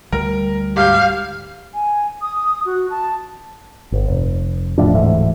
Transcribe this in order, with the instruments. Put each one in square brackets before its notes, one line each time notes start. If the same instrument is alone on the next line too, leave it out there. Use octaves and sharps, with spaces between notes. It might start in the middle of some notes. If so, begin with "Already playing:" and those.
[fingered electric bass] D2 G3 [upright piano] A#4
[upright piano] G#1 G6 [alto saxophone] G4 [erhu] F5
[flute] G#5
D#6
F#4
A5
[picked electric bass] G1
F1
E1 A2 F3 D4
D1 G#2 E3 A3